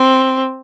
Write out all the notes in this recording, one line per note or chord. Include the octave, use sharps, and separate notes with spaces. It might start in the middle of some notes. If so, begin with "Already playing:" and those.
Already playing: C4